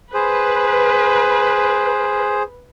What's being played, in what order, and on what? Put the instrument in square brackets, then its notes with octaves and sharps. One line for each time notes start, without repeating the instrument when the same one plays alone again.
[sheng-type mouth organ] G#4 C5 [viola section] B4